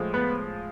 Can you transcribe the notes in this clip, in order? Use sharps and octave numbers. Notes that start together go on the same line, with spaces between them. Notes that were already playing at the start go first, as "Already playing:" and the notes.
Already playing: A2 F3 G#3
B3 B4